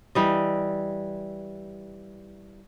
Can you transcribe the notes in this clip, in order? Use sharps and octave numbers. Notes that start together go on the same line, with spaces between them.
E3 G3 D#5